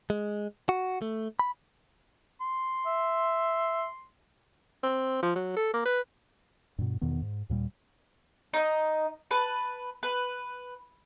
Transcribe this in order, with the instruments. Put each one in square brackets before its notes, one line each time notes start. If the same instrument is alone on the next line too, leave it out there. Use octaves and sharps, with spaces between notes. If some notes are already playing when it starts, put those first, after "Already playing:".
[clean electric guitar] G#3
F#4
A3
B5
[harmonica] C6
[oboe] E5
[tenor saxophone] C4
F3
F#3
A4
A#3
B4
[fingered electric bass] G2 B2
E2 B2 D#3 B3
G#2
D#2 A#2 G3
[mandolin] D#4 D#5
B4 A5
B4